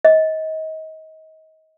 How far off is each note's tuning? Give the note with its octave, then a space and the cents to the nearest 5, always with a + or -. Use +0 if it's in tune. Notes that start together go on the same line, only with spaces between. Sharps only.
D#5 +30